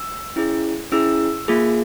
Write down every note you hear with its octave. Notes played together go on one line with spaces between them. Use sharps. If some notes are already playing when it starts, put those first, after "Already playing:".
Already playing: E6
C#4 E4 G#4
C#4 E4 G#4 E6
A#3 F4 G#4